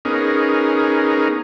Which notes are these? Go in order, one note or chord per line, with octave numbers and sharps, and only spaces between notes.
B3 C#4 D#4 G#4 A#4